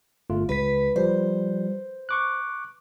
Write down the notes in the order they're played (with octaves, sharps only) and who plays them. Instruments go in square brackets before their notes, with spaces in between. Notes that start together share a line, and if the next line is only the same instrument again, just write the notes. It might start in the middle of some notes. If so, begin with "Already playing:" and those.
[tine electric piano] G1 A3 F4
[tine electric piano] C#2 B6 [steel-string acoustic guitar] B4
[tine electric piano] F3 G3 [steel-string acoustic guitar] C5
[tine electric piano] C#6 D6 F#6